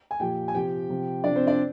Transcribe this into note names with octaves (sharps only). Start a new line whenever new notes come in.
G#5
A#2 F3 G4 G5
G#5
C3 F3 G4 G5
C3 F3
C3 F3 D4 D5
C4 C5
D4 D5